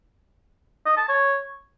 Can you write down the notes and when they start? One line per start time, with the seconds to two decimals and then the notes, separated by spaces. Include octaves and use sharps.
0.86 D#5
0.97 A5
1.09 C#5